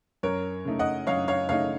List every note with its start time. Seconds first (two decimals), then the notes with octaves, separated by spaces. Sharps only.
0.23 F#2 A#4 C#5
0.65 C#3 A3 D#4
0.79 D#5 F#5
1.07 F#2 C#5 F5
1.28 C#5 F5
1.49 C#3 A3 D#4 C#5 F5